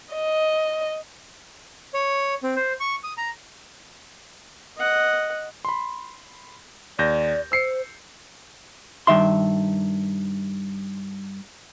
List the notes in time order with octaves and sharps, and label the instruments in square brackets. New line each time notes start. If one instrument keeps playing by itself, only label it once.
[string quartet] D#5
[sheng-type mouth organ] C#5
C4
C5
C#6
D#6
A#5
[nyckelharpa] D#5 F#5
[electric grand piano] B5 C6
[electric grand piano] D#2 G6 A#6 [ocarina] D5
[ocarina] C5 [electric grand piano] E6 C7 C#7
[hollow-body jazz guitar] G2 D#3 E5 C6